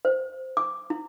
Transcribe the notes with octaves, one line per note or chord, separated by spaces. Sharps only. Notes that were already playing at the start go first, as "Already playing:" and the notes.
C5
D6
E4